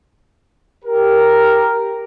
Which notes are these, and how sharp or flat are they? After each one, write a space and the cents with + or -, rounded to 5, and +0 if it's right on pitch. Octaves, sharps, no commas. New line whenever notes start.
G4 +0 A#4 +0